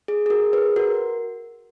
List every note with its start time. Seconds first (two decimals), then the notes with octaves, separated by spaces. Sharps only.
0.08 G#4
0.26 G#4
0.30 F#4 A#4
0.53 G#4 B4
0.76 F#4 A#4